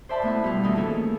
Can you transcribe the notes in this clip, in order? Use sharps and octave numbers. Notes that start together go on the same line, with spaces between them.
C5 D5 E5 A5 B5 C6
A2 A3 B3 E4
B2 G3 E4 F4
F2 D#3 E3 A3 D#4 E4
D#3 A3 A#3 C#4 G#4 A4